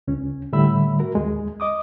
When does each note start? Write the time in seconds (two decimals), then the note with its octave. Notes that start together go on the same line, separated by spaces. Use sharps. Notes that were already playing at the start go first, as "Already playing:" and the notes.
0.08 C#2 C#4
0.53 A2 D3 G3 E5 B5 E6
1.00 F#4 A#4
1.15 D#2 G#3
1.60 D#5 D6 D#6